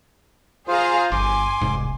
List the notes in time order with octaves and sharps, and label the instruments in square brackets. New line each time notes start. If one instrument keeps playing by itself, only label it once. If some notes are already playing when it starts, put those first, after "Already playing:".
[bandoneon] F4 C5 [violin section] G#4 F5 A#5
[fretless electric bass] G1 [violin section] G#5 [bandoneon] C6 D6
[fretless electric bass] E1 C2 G#2